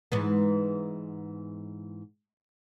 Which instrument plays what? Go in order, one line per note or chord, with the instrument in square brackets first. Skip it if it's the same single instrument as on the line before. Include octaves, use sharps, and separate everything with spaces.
[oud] G#2 E3 B3